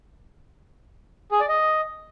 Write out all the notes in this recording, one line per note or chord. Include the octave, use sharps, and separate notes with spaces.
G#4
D5
D#5